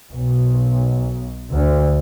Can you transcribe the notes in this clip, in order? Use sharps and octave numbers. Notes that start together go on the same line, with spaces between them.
B1
D2